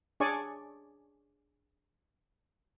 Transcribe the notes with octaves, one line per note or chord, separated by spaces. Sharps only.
D4 G#4 C#5 D5 G#5 C#6